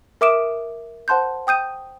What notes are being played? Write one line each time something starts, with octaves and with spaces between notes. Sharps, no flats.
A#4 E5 D6 D#6 D7 E7
C5 F#5 A5 C6 F#6 G6
G5 D#6 G6 D#7